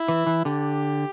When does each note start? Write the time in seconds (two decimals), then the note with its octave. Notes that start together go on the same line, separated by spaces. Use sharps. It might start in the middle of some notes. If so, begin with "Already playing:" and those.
Already playing: E4
0.08 E3
0.27 E3
0.45 D3 G4